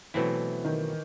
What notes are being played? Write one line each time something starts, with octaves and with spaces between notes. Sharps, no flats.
B2 E3 F#3 A3 C4 E4
D#3